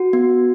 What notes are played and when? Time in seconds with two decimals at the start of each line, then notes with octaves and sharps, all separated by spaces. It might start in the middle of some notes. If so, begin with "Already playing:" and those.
Already playing: F#4
0.13 B3